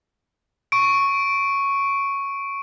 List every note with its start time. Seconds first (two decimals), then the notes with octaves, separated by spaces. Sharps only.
0.72 C#6 D7